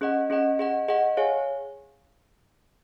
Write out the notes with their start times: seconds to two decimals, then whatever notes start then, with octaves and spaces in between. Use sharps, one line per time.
0.01 C#4 G#4 D#5 F#5
0.30 C#4 G#4 D#5 F#5
0.59 G#4 D#5 F#5
0.88 G#4 D#5 F#5
1.17 G#4 C#5 F5 G#5